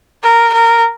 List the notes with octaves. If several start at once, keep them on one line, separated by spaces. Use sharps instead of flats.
A#4
A#4